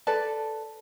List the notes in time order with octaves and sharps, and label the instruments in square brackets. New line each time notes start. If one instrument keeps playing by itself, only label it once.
[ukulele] A4 B4 D5 A5